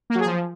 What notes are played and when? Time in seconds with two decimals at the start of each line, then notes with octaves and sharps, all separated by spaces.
0.10 A#3
0.15 F#3
0.20 G#4
0.26 F3